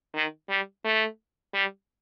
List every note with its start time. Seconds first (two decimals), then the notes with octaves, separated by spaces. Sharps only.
0.14 D#3
0.49 G3
0.84 A3
1.54 G3